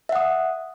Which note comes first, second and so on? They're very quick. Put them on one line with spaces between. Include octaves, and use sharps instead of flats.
E5 F#5 D#6